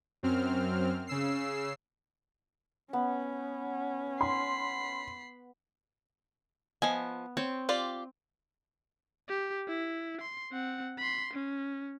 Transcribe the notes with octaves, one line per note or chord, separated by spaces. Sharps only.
F#2 C4 F6
C#3 E6 C7
B3 C#4
B5 C6 C7
F3 B3 D#5 G#5
C4 C#5
F4 G4 D5
G4
E4
C6
C4 F#5
B5 C6
C#4